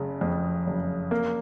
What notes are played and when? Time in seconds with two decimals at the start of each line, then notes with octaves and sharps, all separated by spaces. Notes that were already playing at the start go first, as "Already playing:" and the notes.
Already playing: F#1 C#3
0.21 F2
0.67 F#1
1.11 A#3